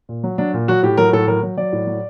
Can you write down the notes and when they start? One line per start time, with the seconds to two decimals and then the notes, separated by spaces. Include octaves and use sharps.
0.09 A#2
0.24 F#3
0.38 F#3 D4
0.54 A#2
0.68 F#3 F#4
0.83 A2 G4
0.98 F#3 A#4
1.13 A2 A4
1.28 F#3 A#4
1.43 F#3
1.58 F#3 D5
1.73 A2
1.87 F#3